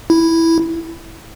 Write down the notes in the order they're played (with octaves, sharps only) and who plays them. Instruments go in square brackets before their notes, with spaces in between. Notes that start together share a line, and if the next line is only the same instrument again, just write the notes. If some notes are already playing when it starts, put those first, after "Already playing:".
[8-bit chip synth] E4